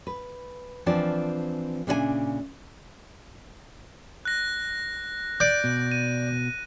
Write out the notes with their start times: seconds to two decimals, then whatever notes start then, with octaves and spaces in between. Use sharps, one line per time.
0.07 B4
0.86 E3 F3 C4 D4 F4 D5
1.87 A#2 C#3 D4 B4 E5 G#5
4.25 F#6 A#6
5.40 D5 G6 D7
5.64 B2
5.92 D#7